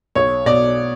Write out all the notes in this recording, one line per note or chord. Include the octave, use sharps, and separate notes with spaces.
B1 C#5
B2 D5